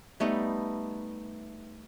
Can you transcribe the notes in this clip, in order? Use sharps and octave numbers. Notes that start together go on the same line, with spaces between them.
G3 A3 B3 D#4